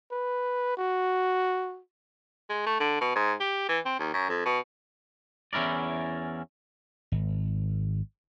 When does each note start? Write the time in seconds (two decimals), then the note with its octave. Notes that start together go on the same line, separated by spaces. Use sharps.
0.12 B4
0.77 F#4
2.50 G#3
2.66 A3
2.80 D3
3.01 B2
3.15 G#2
3.40 G4
3.69 E3
3.85 C4
3.99 D#2
4.14 F#2
4.29 F2
4.46 B2
5.53 E2 C#4 E4 A#4 D5
7.12 G#1